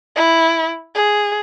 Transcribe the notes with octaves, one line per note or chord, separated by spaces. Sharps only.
E4
G#4